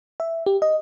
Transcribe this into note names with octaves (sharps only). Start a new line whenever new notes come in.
E5
G4
D#5